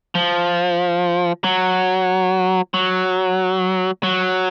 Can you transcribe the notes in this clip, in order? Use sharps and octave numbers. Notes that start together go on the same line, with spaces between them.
F3
F#3
F#3
F#3